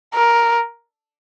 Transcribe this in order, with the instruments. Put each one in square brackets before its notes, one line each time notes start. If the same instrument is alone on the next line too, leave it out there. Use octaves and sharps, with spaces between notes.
[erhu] A#4